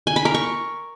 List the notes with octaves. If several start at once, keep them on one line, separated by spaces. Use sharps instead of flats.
G#5
B5
A#4
C#6